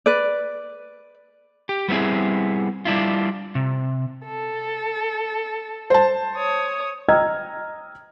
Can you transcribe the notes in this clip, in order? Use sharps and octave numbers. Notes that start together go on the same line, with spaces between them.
B4 D5
G4
G3 B3 C4 E4 G#4
G3 D4 E4 F4
C3
A4
C5 A5
C#5 D#6
D#5 G5 A#5 E6 F6 G#6